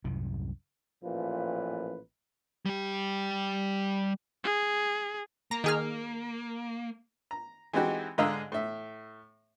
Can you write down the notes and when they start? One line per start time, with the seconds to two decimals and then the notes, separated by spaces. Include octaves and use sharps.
0.04 C2 F#2 A2 C3
1.03 A1 A#2 F3 B4
2.66 G3 G4
4.44 G#4
5.51 A#3 A#5
5.64 D#3 G#4 F6
7.31 A#5
7.73 E3 G#3 C4 D#4 F#4 G4
8.18 G#2 D3 D#5 F5 A#5 E6
8.52 A2 E5